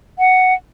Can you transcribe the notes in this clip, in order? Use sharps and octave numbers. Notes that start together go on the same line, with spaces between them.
F#5